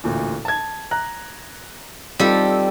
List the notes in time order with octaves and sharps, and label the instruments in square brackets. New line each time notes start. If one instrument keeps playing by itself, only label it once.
[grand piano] A1 D2 A#2
A5 G#6
A#5 F#6
[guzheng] G3 A4 [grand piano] C4 D#4 F4